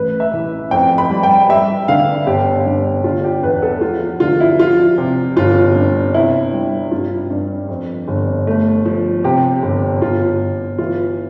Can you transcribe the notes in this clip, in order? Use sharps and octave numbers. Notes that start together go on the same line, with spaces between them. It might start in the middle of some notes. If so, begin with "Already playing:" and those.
Already playing: A1 B4
E5
E3
F2 G5
B5
G3
G5
G3 E5
D3 F5
G1 G4
G2
D3 F4
G4
E2 B4
A4
F3 F4
D3 F4
E4
F3 F4
C3
G1 F4
G2
C3 E4
G3
G2 F4
G2
F2
G1
A3
F3
C3 G4
G1
G1 F4
G1
E3 F4